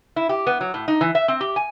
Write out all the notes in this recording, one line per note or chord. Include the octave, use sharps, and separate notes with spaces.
E4
G4
B3
F#3
A2
D#4
E3
E5
C4
G4
G#5